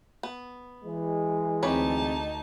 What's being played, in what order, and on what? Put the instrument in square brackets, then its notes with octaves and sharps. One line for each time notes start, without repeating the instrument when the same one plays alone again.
[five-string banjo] B3
[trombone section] E3 G#3
[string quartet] D2 D#4 A5 [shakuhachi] C4 [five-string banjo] G4 B4 C#5